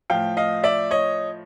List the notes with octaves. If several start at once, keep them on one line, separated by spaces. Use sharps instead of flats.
A2 F3 F5 G5
D#5 F5
D5 E5
C#5 D#5